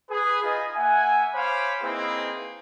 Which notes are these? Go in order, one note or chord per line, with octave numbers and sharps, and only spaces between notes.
G#4 B4
D#4 F4 D#5 G#5 B5 D#6
A#3 E5 F#5 G#5
C5 C#5 F5 G#5 B5 D6
A#3 C4 D#4 E4 G#4 B4